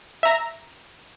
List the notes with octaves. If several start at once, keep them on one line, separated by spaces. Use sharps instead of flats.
E5 A#5